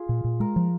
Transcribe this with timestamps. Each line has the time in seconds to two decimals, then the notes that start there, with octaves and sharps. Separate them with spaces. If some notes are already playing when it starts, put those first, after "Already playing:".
Already playing: F4 G#4
0.09 A#2
0.24 A#2
0.40 G#3 A#4
0.56 F3